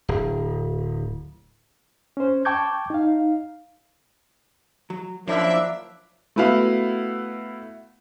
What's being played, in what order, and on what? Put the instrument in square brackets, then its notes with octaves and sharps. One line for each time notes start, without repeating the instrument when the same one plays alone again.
[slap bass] D1
[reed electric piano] C#4 C5
G5 A5 C#6 D6 G6 G#6
D#4 F5
[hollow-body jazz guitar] F#3
[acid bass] F3 [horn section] F#3 A#3 D4 [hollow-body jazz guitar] C#4 E4 [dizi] E5
[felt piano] A3 B3 E4 F#4 F5